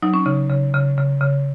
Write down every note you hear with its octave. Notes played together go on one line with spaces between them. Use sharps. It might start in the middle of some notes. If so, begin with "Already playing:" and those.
F#3 D#4
C#4
C#3 D#4
C#3
C#3
C#3
C#3